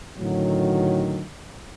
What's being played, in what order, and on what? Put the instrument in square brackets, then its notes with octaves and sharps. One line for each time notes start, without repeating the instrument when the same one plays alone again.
[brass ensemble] A2 D3 D#3 F#3